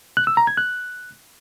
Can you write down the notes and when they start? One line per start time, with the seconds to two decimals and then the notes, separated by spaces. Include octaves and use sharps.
0.17 F#6
0.27 E6
0.37 A#5
0.47 G#6
0.57 F#6